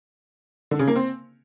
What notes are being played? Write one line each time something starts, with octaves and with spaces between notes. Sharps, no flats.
D3
C#3
A#3
C4